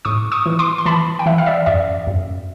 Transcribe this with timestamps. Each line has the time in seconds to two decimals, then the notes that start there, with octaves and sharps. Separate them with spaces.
0.05 A2 C#6 D#6
0.32 C#6 D#6
0.46 E3
0.59 C6 D6
0.78 C6
0.86 E3 A5 B5
1.19 G5
1.26 E3 E5 F#5
1.38 F5
1.46 D5 E5
1.66 F#2 D5 E5
2.07 F#2